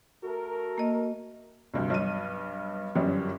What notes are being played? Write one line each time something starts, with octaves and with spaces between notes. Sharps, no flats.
A3 F#4 A4 A#4
A#3 D#5
D2 G2 C3
B1 G2 D#7
G1 F#2 G3 C#4